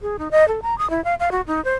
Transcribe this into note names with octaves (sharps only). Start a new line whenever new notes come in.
G#4
D#4
D#5
A4
A#5
D#6
E4
F5
F5
F#4
D#4
C5